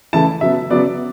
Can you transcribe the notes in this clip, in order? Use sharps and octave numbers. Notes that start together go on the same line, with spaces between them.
C#3 E3 A3 E4 A5
C#3 F#3 B3 E5
C#3 F#3 B3 D5